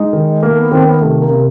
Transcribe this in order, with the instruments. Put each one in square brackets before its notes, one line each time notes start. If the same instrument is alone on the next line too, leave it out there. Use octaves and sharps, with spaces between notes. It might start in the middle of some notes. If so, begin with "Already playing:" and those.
Already playing: [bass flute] G#3 [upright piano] D#4
[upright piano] D#3
[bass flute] A3 [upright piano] A#3
[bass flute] B3
[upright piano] D#3 [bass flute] C4
[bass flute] B3
[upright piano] C3 [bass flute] A3
[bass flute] A#3
[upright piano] C3